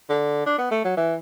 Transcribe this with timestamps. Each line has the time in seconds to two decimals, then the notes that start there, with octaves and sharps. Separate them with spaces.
0.09 D3
0.46 D4
0.58 B3
0.71 A3
0.84 F#3
0.97 E3